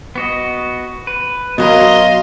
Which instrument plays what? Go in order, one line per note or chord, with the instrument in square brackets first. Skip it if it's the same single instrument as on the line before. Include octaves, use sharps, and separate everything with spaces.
[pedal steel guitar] B3 F#4 D#5
B4
[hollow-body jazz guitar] B2 F#3 A#4 [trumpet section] D#5 [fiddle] F5 C6